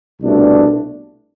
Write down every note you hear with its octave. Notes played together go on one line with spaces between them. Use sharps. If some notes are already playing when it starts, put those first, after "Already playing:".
C2 B2 A3 D4